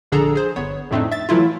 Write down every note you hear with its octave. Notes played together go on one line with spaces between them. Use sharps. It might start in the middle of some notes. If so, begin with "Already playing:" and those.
A#1 D3 D4 G#4 A4 A#5
G#4 C5
G1 B3 C#5
F2 A2 A3 C4 D4 D#4
E5 A6
E3 F#3 A3 E4 F4